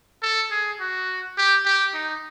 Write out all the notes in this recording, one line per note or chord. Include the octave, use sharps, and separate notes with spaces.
A4
G#4
F#4
G4
G4
D#4